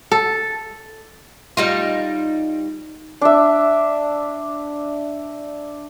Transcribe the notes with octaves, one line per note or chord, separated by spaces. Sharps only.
A4
G3 D#4 F4
D4 E5